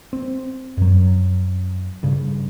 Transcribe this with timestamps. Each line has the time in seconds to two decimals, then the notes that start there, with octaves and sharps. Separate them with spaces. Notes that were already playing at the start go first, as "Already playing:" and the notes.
0.13 C4
0.77 F#2 F#3
2.03 G2 C#3